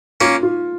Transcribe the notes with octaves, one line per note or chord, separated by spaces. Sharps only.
A#3 C#4 F4
F4